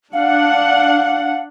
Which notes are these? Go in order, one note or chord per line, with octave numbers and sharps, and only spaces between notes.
D4 F5 F#5